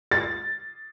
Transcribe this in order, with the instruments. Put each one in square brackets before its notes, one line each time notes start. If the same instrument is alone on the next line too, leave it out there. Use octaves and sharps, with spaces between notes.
[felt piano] A6